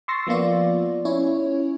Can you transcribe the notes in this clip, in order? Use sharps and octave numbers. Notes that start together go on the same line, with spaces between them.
C6 C#6 E6 A6 A#6 C7
F3 A#3 B3 F4 D5
C#4 E4 C#5